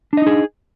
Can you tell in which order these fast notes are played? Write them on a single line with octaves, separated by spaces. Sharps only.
D4 D#5 D#4 G#4